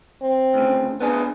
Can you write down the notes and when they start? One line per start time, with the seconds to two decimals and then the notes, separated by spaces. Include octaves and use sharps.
0.22 C4
0.54 D2 C#3
1.00 B3 D4 G#4